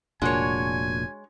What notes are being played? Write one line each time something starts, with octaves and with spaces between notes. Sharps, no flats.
F1 A#2 G#3 D4 F#4 A#4 C#5 G#5